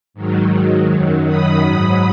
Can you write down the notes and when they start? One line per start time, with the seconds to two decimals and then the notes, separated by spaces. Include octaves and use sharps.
0.14 G#2 D#3 F#3
0.90 F#2 D#3 F#3
1.27 B5 D#6
1.65 G#2 F#3